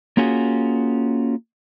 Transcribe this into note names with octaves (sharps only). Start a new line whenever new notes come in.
A#3 C#4 F4 F#4 G#4